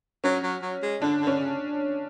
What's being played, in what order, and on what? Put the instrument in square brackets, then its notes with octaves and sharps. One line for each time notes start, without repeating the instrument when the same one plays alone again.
[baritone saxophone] F#3 [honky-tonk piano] C#4
[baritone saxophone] F#3
F#3
G#3
[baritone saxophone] D3 [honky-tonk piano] D4
[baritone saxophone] D3
[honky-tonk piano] C#4
[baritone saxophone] C#3